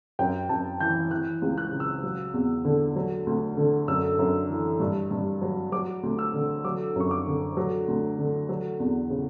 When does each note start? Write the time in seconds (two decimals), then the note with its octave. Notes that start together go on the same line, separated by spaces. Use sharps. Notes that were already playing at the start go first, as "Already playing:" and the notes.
0.19 F#2 G5
0.49 F#2 A5
0.80 E3 G6
1.11 E3 F#6
1.42 C#2
1.58 F#6
1.72 C#3
1.80 E6
2.03 F#3
2.34 E2
2.65 D3
2.96 F#3
3.27 D2
3.57 D3
3.88 F#2 E6
4.19 F#2
4.49 E3
4.80 G2
5.11 G2
5.42 F#3
5.72 F#3 D6
6.03 D2
6.19 E6
6.34 D3
6.64 F#3 D6
6.96 F#2 C#6
7.11 D6
7.27 D3
7.57 F#3
7.88 D2
8.18 D3
8.49 F#3
8.80 E2
9.10 C#3